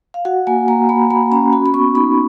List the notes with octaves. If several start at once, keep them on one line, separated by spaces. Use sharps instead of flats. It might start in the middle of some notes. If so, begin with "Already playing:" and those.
F5
F#4 F#5
A#3 G#5
A#3 A#5
A#3 B5
A#3 B5
C#4 A#5
F#4 B5
B5
B3 C#6
D#4 B5